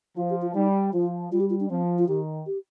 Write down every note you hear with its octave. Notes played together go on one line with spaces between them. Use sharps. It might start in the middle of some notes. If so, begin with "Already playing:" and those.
F3 F4
G4
F4
G3 D#4
F3 F4
G3 F4
G4
F4
D4
F3 C4
F4
D#3 G4
G4